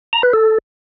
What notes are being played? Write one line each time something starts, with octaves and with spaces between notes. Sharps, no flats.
A#5
B4
A4